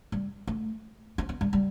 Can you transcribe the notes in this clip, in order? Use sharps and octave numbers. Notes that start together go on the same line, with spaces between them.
G3
A3
C4
B3
G3
G3